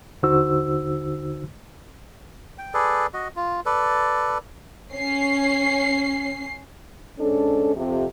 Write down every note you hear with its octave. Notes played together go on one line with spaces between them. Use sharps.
D#2 D3 D#4 F#4 C5 E6
G5
G#4 A4 B4 D5
F#4 D#5
F4
A4 B4 D5
C#4 C7
G#2 C#4 D4 A4
F2 C3